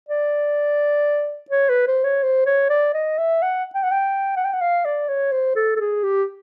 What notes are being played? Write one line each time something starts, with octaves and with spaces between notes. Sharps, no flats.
D5
C#5
B4
C5
C#5
C5
C#5
D5
D#5
E5
F#5
G5
F#5
G5
F#5
G5
F#5
F5
D5
C#5
C5
A4
A4
G#4
G4